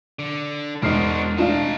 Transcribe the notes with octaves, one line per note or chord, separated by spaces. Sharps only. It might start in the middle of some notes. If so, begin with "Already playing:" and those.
D3
E1 G#2 D4 D#4 F#4 F6 C7
A3 D4 D#4 F4 F5 A5